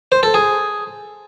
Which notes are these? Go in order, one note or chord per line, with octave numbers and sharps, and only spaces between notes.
C5
A4
G#4